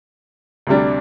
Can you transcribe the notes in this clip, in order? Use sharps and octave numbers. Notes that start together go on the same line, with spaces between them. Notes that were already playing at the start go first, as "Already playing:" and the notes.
D2 C3 G3 D4